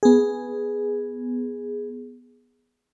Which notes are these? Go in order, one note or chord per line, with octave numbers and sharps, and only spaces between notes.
B3 G#4